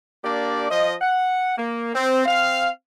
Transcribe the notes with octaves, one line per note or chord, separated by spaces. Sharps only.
A#3 D4 G4 D5
F3 D#5
F#5
A#3
C4
C4 F5